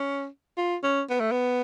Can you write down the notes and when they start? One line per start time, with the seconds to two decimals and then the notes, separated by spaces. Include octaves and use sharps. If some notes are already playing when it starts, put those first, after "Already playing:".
Already playing: C#4
0.57 F4
0.83 C#4
1.10 B3
1.20 A3
1.32 B3